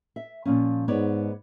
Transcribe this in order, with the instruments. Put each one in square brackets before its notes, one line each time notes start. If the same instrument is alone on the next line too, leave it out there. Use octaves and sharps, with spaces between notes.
[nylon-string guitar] E5
A#2 F3 C#4
[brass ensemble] G#2 [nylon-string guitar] B3 C#5 D5